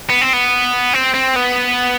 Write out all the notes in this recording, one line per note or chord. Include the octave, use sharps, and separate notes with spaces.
B3
C4
B3
C4
C4
B3